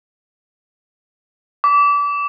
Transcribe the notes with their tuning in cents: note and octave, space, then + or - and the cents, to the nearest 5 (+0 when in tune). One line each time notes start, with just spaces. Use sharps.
D6 -30